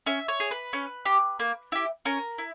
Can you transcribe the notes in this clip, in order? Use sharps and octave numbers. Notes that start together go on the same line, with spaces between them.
C#4 E5
C#5
G#4
B4
C#4
G4
A#3
E4 G4
C#4 A#4
E4